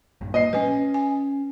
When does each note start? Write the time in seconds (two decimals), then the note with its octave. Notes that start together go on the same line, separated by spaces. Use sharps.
0.21 A#1 G2
0.34 A#2 D#5 C7
0.53 G3 C#4 B4 G#5
0.94 G#5